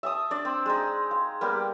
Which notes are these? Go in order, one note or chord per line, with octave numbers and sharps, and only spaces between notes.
E5 A5 D#6
D4 D5
C4
G#3 D#4
F5
G3 A#3 B3 G4